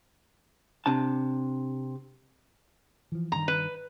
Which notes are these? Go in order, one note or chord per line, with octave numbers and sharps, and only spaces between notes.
C3 D4 A5
E3 F3
G2 D#3 A#5
B4